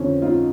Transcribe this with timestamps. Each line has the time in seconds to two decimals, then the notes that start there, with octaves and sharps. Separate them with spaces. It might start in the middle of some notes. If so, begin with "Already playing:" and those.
Already playing: F2 D3 C4 C#4
0.22 D#4 F4